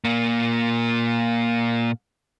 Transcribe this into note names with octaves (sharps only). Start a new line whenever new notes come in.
A#2 A#3